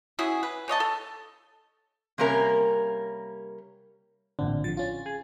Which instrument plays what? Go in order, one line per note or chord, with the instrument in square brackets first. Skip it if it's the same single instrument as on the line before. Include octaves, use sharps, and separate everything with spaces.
[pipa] C#4 E4 F#4 G#4
B4
C#3 C#5 D#5 A5
A4
[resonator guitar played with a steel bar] C3 G3 A#3 C#4 A#4
[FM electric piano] A1 A#2 C4 [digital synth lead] D3
[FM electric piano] D3 F3 [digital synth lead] A6
[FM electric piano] C#4 F4
[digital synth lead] G#4